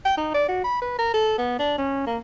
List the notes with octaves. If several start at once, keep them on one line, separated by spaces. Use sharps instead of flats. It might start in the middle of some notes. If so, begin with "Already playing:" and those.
G5
D#4
D5
F#4
B5
B4
A#4
A4
B3
D4
C#4
A#3